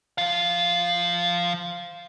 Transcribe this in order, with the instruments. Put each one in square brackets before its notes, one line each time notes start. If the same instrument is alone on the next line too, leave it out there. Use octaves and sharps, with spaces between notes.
[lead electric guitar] F3 F5